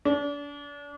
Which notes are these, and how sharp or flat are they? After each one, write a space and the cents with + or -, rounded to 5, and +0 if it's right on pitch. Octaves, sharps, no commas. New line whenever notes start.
D4 -35